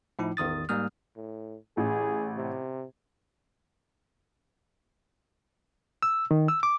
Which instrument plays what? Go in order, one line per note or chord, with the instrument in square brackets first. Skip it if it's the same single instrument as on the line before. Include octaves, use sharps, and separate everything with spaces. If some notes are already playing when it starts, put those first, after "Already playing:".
[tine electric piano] A2 F3 D#4 E4
A1 E2 D#3 D#6 A6
G#2 G3 A#3 D#6 F6
[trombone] A2
[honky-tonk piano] A1 [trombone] G#4
[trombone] C3
[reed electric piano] E6
D#3
E6
D6